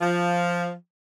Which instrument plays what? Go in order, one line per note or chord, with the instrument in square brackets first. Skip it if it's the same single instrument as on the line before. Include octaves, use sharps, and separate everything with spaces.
[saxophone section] F3